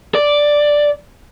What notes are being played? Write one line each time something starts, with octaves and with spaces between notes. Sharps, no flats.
D5